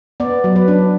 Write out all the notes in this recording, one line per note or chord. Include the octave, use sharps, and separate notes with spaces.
B3 D5
F#3
B4
D4